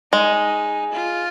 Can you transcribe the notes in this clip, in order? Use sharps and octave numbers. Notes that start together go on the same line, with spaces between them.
G#3 D#4
F4